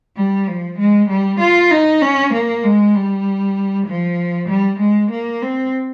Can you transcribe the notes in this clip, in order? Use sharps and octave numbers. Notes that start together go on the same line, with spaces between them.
G3
F3
G#3
G3
F4
D#4
C#4
A#3
G#3
G3
F3
G3
G#3
A#3
C4